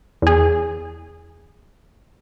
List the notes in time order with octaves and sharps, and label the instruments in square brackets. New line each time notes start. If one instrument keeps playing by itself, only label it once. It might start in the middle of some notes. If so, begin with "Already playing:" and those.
[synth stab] E2 G#4